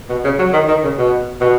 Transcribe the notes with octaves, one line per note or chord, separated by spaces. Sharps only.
B2
C#3
F#3
D#3
D#3
C#3
B2
B2